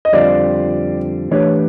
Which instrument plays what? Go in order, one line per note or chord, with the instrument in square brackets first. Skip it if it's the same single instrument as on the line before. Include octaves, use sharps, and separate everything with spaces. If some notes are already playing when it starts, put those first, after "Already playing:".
[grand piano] D#5
[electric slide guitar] F2 D3 G3 C4 F4 [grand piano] D5
[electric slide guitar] E3 A3 D4 G4 B4 [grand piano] C#5